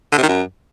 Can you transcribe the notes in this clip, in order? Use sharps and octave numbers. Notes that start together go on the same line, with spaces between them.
D3
C3
D#3
F#2